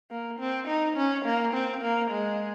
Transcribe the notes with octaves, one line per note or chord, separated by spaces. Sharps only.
A#3
C4
D#4
C#4
A#3
C4
A#3
G#3